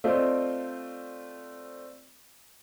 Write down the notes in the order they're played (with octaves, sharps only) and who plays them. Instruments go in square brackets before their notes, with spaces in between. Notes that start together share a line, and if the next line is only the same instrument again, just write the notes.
[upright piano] A3 C4 F4 C5 D5 D#5